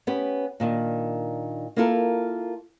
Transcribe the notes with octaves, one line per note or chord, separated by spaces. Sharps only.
B3 C#4 G4 B4
A#2 D#3 D4
A#3 E4 F4 A4 A#4